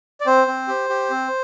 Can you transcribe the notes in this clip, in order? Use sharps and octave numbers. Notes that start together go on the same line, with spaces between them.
D5
C4 C5
C4
G4
G4
C4